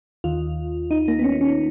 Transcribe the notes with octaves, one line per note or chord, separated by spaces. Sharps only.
D#2 D#3 F4
D#4
A#3
B3
C#4
C#4